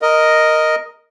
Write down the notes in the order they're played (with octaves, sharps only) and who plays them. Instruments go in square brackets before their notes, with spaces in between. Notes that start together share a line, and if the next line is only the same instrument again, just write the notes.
[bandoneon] A#4 D#5